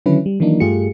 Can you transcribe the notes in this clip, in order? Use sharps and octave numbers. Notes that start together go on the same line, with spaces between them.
D3 D#3 F#3 C#4 E4 B4
G3
D#3 E3 F#3 A#3 D4 D#4
G2 A3 F4 G4 G#4 C#7